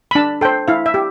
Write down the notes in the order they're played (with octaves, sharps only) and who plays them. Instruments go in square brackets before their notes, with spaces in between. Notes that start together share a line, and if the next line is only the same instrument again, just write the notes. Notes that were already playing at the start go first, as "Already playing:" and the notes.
[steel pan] B5
D4 A5
A4 C5 G5
E4 F5
E5
G4